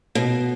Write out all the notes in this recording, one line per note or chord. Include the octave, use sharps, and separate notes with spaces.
B2